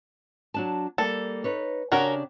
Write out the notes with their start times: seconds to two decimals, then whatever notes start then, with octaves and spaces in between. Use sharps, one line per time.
0.54 F#3 D4 A5
0.98 G3 A#3 A4
1.44 D#4 B4 C#5
1.92 C#3 C#4 D4 F#4 G4 A#4